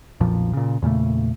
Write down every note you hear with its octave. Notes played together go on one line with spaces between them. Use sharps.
B1 F2 A#2 F3
A#2 C#3
E2 A#2 C#3 A3